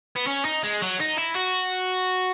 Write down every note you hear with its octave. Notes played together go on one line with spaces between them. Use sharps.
B3
C#4
D#4
G#3
F#3
D#4
E4
F#4